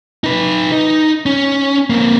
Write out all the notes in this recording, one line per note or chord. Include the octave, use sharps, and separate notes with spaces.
D#4 B4
D#4
C#4
A#3 C4